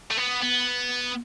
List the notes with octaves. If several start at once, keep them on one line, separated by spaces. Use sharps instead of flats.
A3
B3
B3